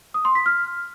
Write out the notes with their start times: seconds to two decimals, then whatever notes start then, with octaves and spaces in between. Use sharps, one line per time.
0.14 D#6
0.25 C6
0.35 B6
0.46 F6